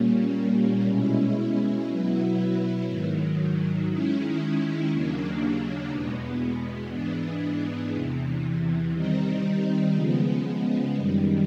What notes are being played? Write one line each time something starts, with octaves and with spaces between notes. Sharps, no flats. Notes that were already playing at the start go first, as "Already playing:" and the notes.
Already playing: A#2 G3 A#3 C#4
B2 G#3 C#4 E4
B2 F#3 B3 E4
G#2 D#3 F#3
D#3 G#3 C#4 E4
D#2 C#3 F#3 A#3 D4
E2 B2 G#3 B3
G#2 E3 G#3 B3 D4
E2 C3 E3
D#3 G3 C4 D#4
C#3 F3 G#3 B3
F#2 D#3 G3